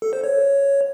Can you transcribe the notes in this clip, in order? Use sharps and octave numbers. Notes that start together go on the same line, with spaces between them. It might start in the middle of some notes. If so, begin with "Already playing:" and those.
A4
C5
C#5